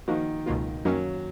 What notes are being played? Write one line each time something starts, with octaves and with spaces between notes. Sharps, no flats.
D#3 F3 A#3 D#4 F#4
C#2 B2 F#3 A#3 F4
F#2 D#3 F#3 A#3 C#4